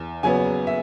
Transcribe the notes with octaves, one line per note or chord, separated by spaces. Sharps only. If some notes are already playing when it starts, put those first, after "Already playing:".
Already playing: E2
C#3 F#3 B3 G#5
E5